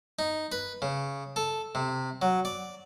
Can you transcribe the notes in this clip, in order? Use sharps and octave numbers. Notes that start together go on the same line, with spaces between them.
D#4
B4
C#3
A4
C3
F#3
D5